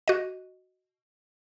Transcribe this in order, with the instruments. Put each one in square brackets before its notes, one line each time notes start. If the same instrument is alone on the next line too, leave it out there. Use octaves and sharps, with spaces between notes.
[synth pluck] F#4 D#5